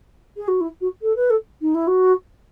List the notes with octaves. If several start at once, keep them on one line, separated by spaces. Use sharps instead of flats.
G#4
F#4
E4
F#4
A4
B4
A4
D#4
E4
F#4